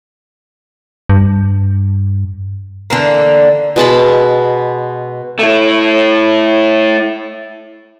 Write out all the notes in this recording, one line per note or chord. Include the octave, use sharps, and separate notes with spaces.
G2
D3 E3 A#3
B2 G#3 A5 B5
A3 E4